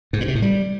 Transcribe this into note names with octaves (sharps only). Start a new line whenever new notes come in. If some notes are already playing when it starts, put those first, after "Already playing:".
G#2
A#2
C3
A2
G3